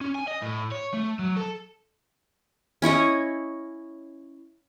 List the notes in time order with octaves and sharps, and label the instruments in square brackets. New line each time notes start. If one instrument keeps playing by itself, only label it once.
[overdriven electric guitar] C#4
G#5
D#5
A2
C#5
A3
F#3
A4
[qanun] C#4 E4 C#5 D#5